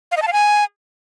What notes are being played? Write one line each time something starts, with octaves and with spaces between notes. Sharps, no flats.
F5
D#5
A5
F5
G#5